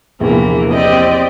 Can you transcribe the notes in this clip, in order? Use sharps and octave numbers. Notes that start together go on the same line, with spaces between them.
A#1 E2 C3 E3 A#3
C4 G4 D5 D#5